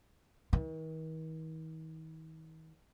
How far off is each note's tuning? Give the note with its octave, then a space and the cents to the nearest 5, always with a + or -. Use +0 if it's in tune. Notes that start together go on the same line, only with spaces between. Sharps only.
D#3 +45